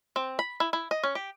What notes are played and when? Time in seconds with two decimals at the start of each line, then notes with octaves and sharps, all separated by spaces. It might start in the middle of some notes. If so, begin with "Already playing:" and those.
0.16 C4
0.39 B5
0.60 E4
0.73 E4
0.91 D#5
1.03 C#4
1.15 G4